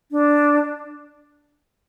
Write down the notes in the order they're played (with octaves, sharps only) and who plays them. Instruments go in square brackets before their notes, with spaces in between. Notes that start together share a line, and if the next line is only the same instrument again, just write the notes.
[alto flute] D4